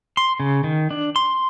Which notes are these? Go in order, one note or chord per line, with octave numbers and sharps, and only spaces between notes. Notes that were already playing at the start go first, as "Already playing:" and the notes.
C6
C#3
D#3
D4
C6